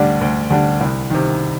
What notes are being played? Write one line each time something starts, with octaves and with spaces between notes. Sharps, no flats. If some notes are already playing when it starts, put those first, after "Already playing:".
Already playing: D2 D3 G3 D4
D2
D3 G3 D4
C2
C3 D#3